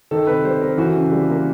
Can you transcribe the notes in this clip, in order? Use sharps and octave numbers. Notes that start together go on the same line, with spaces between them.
D#3 A4
C3 B4
G3 C5
C4 A#4
E3 F#4
C#3
G3
A#3